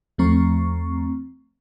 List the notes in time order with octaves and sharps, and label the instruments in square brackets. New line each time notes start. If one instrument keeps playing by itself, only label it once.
[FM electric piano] E2 F3 A3 C4 A#5 C#6